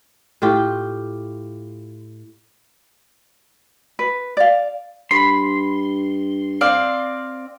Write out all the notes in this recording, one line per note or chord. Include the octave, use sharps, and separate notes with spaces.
A2 F4 G4
B4
D5 F5
G2 B5 C6
C4 D5 F5